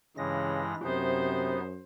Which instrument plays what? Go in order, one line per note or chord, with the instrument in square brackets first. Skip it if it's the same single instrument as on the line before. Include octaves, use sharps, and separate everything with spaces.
[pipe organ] G2 G#3 A#6 [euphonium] C#3 [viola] E3
[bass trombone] F#2 [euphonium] C3 [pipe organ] B3 D#4 [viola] C5